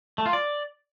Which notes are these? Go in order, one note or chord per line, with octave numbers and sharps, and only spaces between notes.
A3
F4
D5